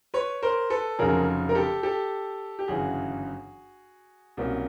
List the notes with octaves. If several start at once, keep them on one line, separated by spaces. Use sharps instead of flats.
B4 C#5
A#4 C5
A4 B4
F1 F2 C#3 F#3 G#4 A#4
A#4
G4 A4
G4 A4
G4
G1 F#2 C#3 E3 F#4 G#4
C2 B2 F#3 A#3 C#4